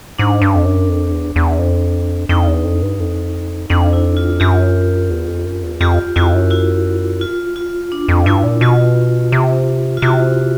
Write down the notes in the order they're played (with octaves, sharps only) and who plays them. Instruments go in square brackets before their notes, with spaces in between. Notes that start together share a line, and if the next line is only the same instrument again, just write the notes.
[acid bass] G#2 [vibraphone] D4
[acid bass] G2
F2
F#2
F2
E2
E2
F2
[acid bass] F2 [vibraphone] D#4
[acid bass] E2
F2
G2
F2
[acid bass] F2 [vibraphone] D4
[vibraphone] E4
F4
[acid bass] F#2 [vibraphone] F4 G4
[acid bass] E2
F2
F#2
E2
[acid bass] F2 [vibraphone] F4 G4
[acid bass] F2 [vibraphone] E4 F#4
[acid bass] F#2
[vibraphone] E4 F#4
F4
F4
D4
[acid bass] F2
[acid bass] G2 [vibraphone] E4
[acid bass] A#2
[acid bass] B2 [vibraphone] F4
[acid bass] C3
[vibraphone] F4
[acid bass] C3 [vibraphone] E4 F#4